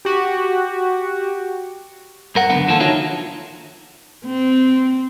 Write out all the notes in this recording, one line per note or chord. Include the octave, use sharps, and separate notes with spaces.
F#4 G4
G2 A#4 F#5
C#2 F#2 D3 B3 F#5
D#3 F3 A#3 A4
D4 D#4 F4 F#4 C#5 E5
C4